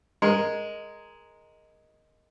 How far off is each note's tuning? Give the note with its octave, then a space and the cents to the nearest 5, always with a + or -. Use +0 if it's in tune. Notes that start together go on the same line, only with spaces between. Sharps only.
G#3 +0 A#4 +0